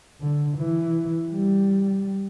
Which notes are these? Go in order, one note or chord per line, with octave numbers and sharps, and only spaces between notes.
D3
E3
G3